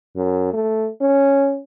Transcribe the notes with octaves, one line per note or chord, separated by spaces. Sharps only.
F#2
A3
C#4